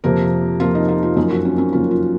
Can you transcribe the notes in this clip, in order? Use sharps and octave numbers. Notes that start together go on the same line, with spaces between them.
F2 C3 F3 A#3 A#4
F2 C3 F3 A#3 F4
D#4
F4
F4
F#2 F3 A#3 D#4
F#4
C#4
C#4
F#2 F3 A#3 F4
F4